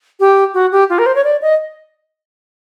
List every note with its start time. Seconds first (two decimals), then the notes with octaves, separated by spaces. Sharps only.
0.20 G4
0.54 F#4
0.72 G4
0.90 F4
0.99 A#4
1.06 C5
1.15 C#5
1.24 D5
1.42 D#5